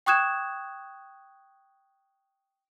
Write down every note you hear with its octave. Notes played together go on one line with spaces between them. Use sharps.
G5 C#6 D#6 F#6 G#6 E7